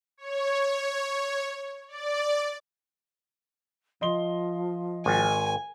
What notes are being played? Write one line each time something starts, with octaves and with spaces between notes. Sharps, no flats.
C#5
D5
F3 D#5 C6 G7
G#1 G#5